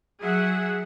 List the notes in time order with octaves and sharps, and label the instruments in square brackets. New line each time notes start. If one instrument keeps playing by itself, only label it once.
[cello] F#3 [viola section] G#4 E5 F#5